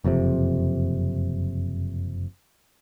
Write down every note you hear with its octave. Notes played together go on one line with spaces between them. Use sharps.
F#1 F2 G#2 C3